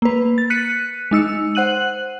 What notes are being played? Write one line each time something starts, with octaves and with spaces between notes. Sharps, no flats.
A#3 B4
A6
F#6 B6 C#7 D#7
G#3 D#4 E6 C#7
C5 F#5 F#6 D#7 F#7